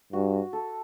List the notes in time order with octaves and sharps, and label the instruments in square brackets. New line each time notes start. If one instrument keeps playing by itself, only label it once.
[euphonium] G2 [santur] F#4
[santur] A4